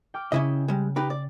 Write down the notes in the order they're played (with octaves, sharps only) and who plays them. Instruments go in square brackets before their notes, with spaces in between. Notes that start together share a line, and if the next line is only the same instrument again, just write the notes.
[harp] G5 D6 F6
[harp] C#3 [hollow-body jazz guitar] C#4 E4 D#5
[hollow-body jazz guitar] G3 G#3
D#4 G4 B4
D5